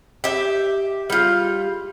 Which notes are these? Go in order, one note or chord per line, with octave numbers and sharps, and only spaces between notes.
G4 E5
G3 F4